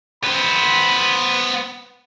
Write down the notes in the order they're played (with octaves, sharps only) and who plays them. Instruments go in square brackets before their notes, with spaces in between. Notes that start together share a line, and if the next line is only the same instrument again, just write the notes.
[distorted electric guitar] B3 C5 [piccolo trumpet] B5